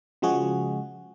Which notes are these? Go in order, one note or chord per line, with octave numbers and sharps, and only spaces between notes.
C#3 F3 G#3 F#4 G#4